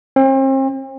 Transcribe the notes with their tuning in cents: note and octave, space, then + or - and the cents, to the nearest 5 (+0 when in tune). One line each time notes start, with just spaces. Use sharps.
C4 +40